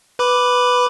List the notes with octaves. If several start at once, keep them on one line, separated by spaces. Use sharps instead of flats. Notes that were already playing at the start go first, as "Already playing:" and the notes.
B4 B5 D6